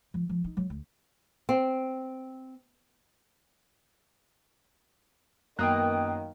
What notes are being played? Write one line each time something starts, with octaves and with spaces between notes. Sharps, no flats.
F3
F3
D#4
F#3
D2
C4
F#2 D#3 A#3 B3 G5 D#6 F#6